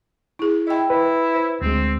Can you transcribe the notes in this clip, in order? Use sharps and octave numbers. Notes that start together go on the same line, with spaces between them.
E4 G#4
E4 D#5 G5
E4 B4
C5
D2 G#3 C4